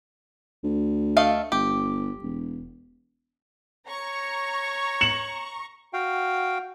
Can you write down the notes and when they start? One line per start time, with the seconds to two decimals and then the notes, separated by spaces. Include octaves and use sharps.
0.64 D2
1.17 A3 D#5 F5
1.52 G1 G4
2.22 E1
3.88 C#5 A#5 C#6
5.01 C#7 E7 F#7
5.93 F#4 F5 G5